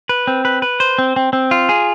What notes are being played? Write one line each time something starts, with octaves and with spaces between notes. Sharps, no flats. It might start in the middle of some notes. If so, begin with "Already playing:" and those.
B4
C4
B4
B4
C5
C4
C4
C4
F4
G#4